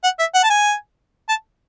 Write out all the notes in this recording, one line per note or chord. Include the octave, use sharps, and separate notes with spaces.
F#5
E5
F#5
A5
G#5
A5